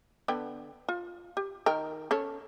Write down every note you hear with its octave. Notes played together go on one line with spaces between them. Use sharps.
D3 B3 G5
F4
G4
D#3 A#4 G5
C#4 A4 C#5